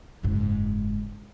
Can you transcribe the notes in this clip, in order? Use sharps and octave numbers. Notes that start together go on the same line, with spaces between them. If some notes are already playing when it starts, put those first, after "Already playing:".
F#1 G#2